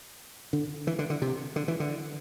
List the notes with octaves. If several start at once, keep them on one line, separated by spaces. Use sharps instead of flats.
D3
E3
D3
D3
C3
D3
E3
D3